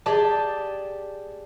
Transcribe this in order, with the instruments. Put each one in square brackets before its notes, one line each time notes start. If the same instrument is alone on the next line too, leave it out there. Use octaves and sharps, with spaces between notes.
[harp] G4 G#4 D5 A5